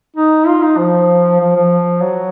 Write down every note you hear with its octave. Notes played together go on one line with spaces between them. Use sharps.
D#4
F4
D#4
F3
F3
F3
F#3